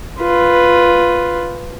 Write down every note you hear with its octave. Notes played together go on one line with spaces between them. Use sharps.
F4 B4